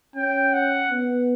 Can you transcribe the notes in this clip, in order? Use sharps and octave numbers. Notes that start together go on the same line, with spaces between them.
C#4 G5
F#5
B3